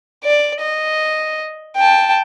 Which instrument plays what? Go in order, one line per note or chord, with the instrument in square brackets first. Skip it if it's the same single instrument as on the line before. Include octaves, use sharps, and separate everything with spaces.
[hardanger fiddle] D5
D#5
G5 A5